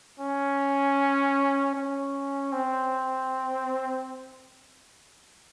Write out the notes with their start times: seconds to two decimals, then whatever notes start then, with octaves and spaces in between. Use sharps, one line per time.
0.19 C#4
1.74 C#4
2.52 C4